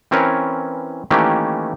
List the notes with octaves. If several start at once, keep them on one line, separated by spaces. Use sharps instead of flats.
E3 C4 C#4 A#4 B4 C#5
D#3 E3 A3 A#3 C#4 G4